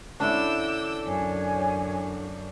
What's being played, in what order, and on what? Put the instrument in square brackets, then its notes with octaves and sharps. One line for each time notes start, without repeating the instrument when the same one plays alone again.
[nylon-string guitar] D3 C#4 E4 [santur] D4 [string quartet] D6 E6 G6
[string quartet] F#2 [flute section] C#5 G#5